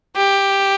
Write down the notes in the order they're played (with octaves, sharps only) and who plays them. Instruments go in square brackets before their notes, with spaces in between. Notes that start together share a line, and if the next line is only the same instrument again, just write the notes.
[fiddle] G4